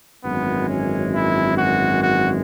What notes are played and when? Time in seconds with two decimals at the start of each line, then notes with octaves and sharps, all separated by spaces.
0.21 G#1 F#2 E3 G#3 B3
0.66 C#4
1.11 E4
1.56 F#4
2.01 F#4